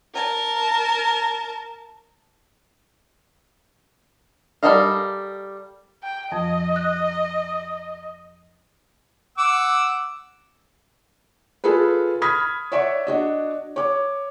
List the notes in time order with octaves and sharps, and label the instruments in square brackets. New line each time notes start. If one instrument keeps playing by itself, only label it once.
[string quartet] A#4 A5
[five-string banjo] G3 A4 A#4 D#5 F5
[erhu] G5
[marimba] F2 F3 [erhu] D#5
[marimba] F#6
[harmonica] F#5 D6 E6
[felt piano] F4 G#4 A4 B4
B5 D#6 F6 G#6 B6
C#5 D5 E5 F#5 C#6
D4 F#4 D#5
C#5 D6